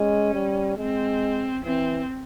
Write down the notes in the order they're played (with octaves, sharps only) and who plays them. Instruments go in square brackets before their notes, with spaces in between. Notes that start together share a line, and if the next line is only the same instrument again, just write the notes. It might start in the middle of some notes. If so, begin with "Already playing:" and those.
Already playing: [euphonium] G#3 [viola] C#4
[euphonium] G3
[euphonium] G#3 [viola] C4
[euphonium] E3 [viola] C4